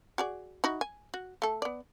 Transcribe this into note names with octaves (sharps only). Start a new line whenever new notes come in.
F#4 G#4 D5
D#4 E4 F#4
G#5
F#4
A3 A4
B3 D5